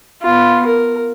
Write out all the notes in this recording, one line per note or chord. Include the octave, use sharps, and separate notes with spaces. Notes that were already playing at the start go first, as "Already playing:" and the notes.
B3 F4
A#4